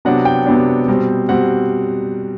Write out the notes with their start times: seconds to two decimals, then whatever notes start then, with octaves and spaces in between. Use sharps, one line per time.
0.05 C3 F#3 B3 D4 F#5
0.25 G5
0.46 C3 F#3 B3 D4
0.88 B2 G3 C4
1.29 B2 G3 C4 F#5